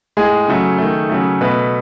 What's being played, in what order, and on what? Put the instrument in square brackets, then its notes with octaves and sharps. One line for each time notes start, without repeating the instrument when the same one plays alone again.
[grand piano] A2 G#3 G#4
C#3 F#3 A3
D#3 A3
C#3 F#3 A3
B2 A3 B4